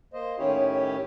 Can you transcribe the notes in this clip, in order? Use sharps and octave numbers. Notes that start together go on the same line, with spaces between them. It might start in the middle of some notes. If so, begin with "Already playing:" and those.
A#3 C5 D#5
A2 D#3 C#4 E4 G4 C#5